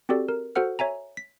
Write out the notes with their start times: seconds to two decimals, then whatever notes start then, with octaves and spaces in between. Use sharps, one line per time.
0.09 C4 F#4 G4 A4 D5
0.29 A#4
0.56 F#4 A4 C5 F#5 F6
0.79 C#5 E5 G#5 A#5
1.17 B6